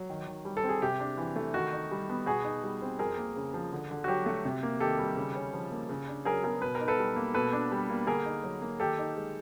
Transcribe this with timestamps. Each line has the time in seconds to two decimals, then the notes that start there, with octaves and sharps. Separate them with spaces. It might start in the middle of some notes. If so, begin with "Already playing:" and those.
Already playing: F#3
0.10 D#3
0.27 D#3
0.45 G3
0.57 A4
0.64 C4
0.69 G#4
0.82 C3 G4
1.00 D4
1.18 E3
1.36 A3
1.54 D#3 F#4
1.73 D#4
1.91 G3
2.09 B3
2.26 B2 F#4 G#4
2.44 D#4
2.63 G3
2.82 C4
2.99 F2 G#4 A#4
3.18 A#3
3.36 C#3
3.54 F3
3.73 D3
3.91 D3
4.04 F#4
4.08 F#3 G4
4.26 A3
4.45 C3
4.63 A#3
4.80 D#3 G4 A4
4.99 G3
5.17 C#3
5.35 C#4
5.53 F3
5.72 A#3
5.89 C#3
6.08 D4
6.25 F#3 G#4 A#4
6.44 B3 G#4 A#4
6.62 B2 B4
6.75 A#4
6.81 D#4
6.88 A4 B4
6.99 G3
7.16 A#3
7.34 B2 A4 B4
7.53 D4
7.72 G3
7.89 A#3
8.07 D3 G#4 A#4
8.26 D#4
8.44 F#3
8.62 A#3
8.80 D#3 G4 A4
8.99 D#4
9.16 G#3